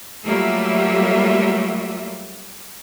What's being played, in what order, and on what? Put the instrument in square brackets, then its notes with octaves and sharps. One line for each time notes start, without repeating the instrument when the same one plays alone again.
[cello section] F#3 G3 A3 A#3 F4 E5